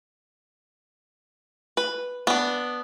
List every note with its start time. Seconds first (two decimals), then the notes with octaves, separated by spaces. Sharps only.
1.77 B4
2.27 B3 D4